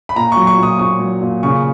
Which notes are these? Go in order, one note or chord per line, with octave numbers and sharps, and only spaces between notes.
B5
A#2 A#5
F#3 C#6
C#6
A#2 D#6
A#2 C#6
F#3
A#2
C#3 C#6